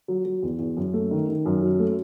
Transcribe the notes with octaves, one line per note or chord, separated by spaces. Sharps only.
F#3
F#3
E2
E2
F#2
A3
D#3
D#3
F#2
F#3
A3